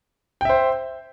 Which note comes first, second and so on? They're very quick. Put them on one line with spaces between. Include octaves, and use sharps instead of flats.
G5 E5 C5